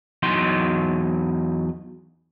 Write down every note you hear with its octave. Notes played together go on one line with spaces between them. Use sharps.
E2 F#3 D#4 C6